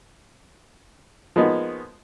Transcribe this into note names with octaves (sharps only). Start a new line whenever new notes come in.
F3 G#3 A#3 B3 D#4 F#4